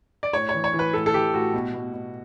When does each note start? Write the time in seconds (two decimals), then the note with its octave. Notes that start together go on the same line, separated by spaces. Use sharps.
0.23 D5
0.33 A2 C#5
0.49 C#5
0.54 E3
0.64 C#5
0.73 E3
0.79 B4
0.93 A2 A4
1.06 A4
1.14 E3 G4
1.34 A2 F#4
1.54 B2
1.74 B2
1.93 B2